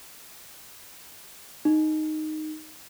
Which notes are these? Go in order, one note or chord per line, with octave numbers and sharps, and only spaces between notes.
D#4